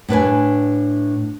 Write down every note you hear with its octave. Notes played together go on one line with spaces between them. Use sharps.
A2 D4 B4 G#5